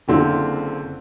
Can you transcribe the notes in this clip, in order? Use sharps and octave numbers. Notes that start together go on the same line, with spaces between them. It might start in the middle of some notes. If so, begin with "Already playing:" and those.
F#1 D3 C4 E4 F4